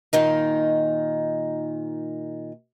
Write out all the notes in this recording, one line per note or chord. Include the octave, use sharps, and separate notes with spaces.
A#2 D#3 D#4